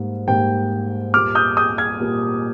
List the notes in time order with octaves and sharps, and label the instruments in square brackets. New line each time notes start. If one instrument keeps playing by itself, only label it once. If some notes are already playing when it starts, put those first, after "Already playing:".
Already playing: [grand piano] G#2 G3 A#3
G#2 G3 A#3 G5
A#2 G3 A#3 D6 F6
D#6 G6
D#6 G6
F6 G#6
A#2 G3 A#3